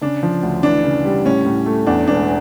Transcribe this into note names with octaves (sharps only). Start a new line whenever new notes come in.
C#3 D4
F3
D2
E3 D4
C#3
G3
A2 C#4
A2
A3
E2 D4
E1 D4